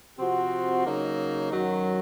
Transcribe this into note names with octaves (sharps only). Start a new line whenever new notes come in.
C3 F3 C4 F#4
C#3 F#3 A#3 D#4
F#2 D#3 F#3